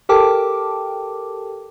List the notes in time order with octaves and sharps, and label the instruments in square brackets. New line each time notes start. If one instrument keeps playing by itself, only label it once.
[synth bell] G4 A4 A#4 G5 A5 D6